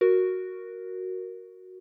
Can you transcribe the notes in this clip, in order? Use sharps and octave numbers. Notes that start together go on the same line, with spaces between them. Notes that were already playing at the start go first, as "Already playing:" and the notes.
F#4 A#4